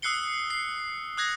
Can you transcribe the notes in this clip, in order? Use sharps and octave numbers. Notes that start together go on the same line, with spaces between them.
D#6 E6 F#6 C7 C#7 G7
C7
D#6 F#6 G#6 A#6